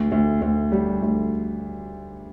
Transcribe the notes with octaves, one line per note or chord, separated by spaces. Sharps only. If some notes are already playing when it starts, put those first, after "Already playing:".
Already playing: D2
D2
D2
G3
D2